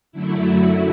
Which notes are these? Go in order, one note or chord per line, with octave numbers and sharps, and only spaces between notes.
F#2 D3 F#3 A3 E4
F#4